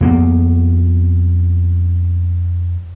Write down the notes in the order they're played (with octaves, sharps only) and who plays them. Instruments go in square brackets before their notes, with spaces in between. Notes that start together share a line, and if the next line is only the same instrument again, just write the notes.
[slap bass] F2 A#3 B3